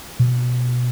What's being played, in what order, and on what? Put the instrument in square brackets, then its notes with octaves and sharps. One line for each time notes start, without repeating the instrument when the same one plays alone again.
[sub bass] B2